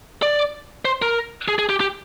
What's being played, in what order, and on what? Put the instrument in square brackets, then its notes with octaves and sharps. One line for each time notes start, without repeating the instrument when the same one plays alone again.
[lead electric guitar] D5
C5
A#4
G#4
G#4
G4
G4